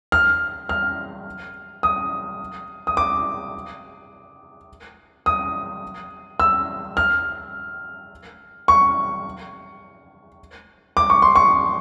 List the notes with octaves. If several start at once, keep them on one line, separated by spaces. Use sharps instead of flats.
F6
F6
D#6
D#6
D6
D#6
E6
F6
C#6
D6
C#6
C6
C#6